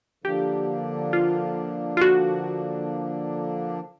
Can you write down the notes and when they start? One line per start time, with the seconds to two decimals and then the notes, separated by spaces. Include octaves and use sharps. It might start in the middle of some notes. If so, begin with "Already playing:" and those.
0.24 D3 F3 A#3 D4 G4
1.13 F4
1.97 F4
2.01 F#4